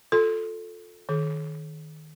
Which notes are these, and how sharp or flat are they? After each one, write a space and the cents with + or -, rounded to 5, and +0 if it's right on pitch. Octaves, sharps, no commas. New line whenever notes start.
F4 +30 A4 +0 C6 +0
D#3 -5 G#4 +45